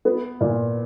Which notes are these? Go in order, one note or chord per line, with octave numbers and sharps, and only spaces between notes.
B3
A#2